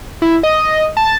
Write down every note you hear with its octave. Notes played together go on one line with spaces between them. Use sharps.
E4
D#5
A5